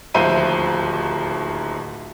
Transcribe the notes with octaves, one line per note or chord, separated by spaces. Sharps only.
D1 D#2 F3 C5 E5 D#7